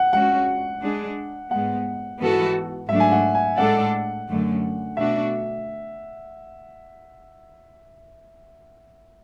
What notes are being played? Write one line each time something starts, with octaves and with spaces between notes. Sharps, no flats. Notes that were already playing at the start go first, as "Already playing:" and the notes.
Already playing: F#5
G#3 C#4 F#4 F#5
G#3 D4 G#4
G#2 G#3 B3 F#5
G#2 E3 B3 F#4 A4
G#2 F#3 A3 D4 E5
G#5
F#5
G#5
A2 G#3 D4 A4 D5 F#5
F#2 D3 A3
B2 A3 D4 F#4 E5